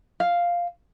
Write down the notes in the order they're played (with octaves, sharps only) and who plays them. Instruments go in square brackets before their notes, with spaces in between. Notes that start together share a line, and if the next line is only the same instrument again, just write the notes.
[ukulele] F5